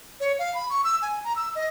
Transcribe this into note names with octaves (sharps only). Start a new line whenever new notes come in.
C#5
F5
B5
C#6
E6
G#5
A#5
E6
D#5